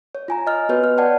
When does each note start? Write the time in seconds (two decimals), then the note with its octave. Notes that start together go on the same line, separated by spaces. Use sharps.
0.15 C#5
0.28 F4 G#5 A#5
0.47 D#5 F6
0.69 B3 F#4 B4 C#5
0.84 F6
0.98 D5 F#5 G5 A5